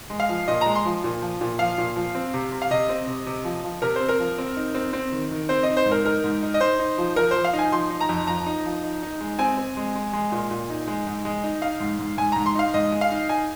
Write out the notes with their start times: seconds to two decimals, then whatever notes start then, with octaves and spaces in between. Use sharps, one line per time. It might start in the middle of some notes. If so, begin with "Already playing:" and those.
0.10 G#3
0.20 F5
0.29 F3
0.48 A#2 D#5
0.61 G#3 A#5
0.75 C6
0.85 F3
1.04 A#2
1.22 F3
1.41 A#2
1.59 F3 F5
1.78 A#2
1.96 F3
2.15 C4
2.34 C3
2.52 C3
2.62 F5
2.71 C3 D#5
2.89 C4
3.07 C3
3.26 C3
3.44 F3
3.64 F3
3.82 C3 A#4
3.96 C4 C5
4.09 A#4
4.19 F3
4.38 C4
4.56 D#4
4.75 C4
4.93 C4
5.12 D#3
5.31 D#3
5.49 C4 C5
5.63 D#4 D#5
5.77 C5
5.86 G#2
5.91 A#4
6.05 D#4 A#4
6.24 G#2
6.43 D#4
6.54 D#5
6.60 D#4 C5
6.79 D#4
6.98 F3
7.16 F3 A#4
7.31 F3 C5
7.45 F5
7.53 D#4
7.59 G#5
7.72 F3 C6
7.90 D#4
8.00 A#5
8.09 F2
8.27 F3 A#5
8.46 D#4
8.65 F3
8.84 D#4
9.03 D#4
9.21 G#3
9.39 C4 G#5
9.58 C4
9.77 G#3
9.95 G#3
10.13 G#3
10.32 A#2
10.51 A#2
10.70 D#4
10.88 G#3
11.07 G#2
11.25 G#3
11.44 D#4
11.62 D#4 F5
11.80 G#2
11.99 G#2
12.17 G#2 G#5
12.32 G#2 A#5
12.46 C6
12.55 D#4 F5
12.74 G#2 D#5
12.92 G#3
13.01 F5
13.11 D#4
13.29 D#4 G#5